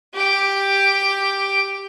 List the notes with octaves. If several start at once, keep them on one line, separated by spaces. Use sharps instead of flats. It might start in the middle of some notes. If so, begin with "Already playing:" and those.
G4 G5